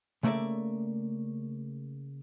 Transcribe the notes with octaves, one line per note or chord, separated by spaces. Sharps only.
C#3 A3 A#3 D5 E5